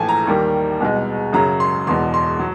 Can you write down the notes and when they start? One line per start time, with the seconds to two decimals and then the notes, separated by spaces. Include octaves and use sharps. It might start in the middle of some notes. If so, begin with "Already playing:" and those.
Already playing: A#1 A2 E3 A3 G#5 A5
0.09 A#5
0.27 D#2 D#3 G3 A#3
0.80 C2 B2 G#3
1.33 F#2 C#3 F#3 A#5
1.60 C6
1.86 E1 E2 B2 C6
2.14 C6
2.39 F#3